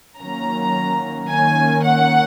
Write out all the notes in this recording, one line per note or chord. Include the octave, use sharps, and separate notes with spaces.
D#3 F#3 A#3 C#4 A#5
D#3 A#3 C#4 G#5
F#5